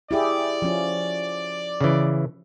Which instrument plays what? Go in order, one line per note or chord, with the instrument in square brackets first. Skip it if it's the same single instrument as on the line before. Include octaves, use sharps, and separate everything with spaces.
[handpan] E4 G4 G#4 [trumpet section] D5
[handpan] F3 C#4
[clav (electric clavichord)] C#3 E3